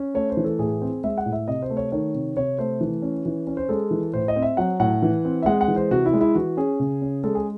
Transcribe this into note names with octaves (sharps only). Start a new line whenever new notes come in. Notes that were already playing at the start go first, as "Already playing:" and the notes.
Already playing: C#4
A3 C#5
C5
E3
A4
A2 G#4
C4
G#3 E5
F#5
A2
E5
C3 D#5
C5
A3
C#5
D#3 C#5
C3
C3 C#5
A3 C5
E3
C#4
E3
C#4
C5
G#3 A4
E3
A2 C5
D#5
C4
E5
F#3 F#5
A2 F#5
E3
C4
E5
G#3 F#5
F#5
E3
C5
C3 F#4
E4
G#3
E4
E3 F#4
C#4 G#4
C#3
C#4
G#3 A4
G#4